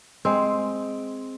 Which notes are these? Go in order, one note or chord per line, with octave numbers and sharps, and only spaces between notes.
G#3 C4